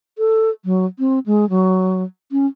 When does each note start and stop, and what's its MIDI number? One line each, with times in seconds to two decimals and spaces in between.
0.18 0.50 69
0.65 0.86 54
0.99 1.19 60
1.26 1.48 56
1.50 2.03 54
2.32 2.46 61